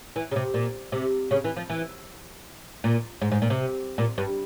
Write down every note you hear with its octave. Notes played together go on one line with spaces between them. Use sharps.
E3
C#3
C3
A#2
C3
C#3
E3
F3
E3
A#2
G#2
G#2
A#2
C3
A#2
G2